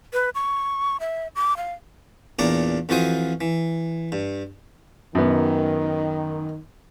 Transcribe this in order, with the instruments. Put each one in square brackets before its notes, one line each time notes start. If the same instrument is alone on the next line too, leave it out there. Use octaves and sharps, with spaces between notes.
[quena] B4
C#6
E5
D6
F5
[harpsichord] E2 A#2 D4 C#5 D5 A#5
F2 E3 F4 F#4 C5 D#6
E3
G2
[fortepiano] F#2 B3 [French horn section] D#3